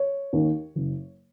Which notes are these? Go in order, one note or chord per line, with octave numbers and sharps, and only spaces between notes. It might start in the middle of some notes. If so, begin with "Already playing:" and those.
Already playing: C#5
D#2 D#3
F#1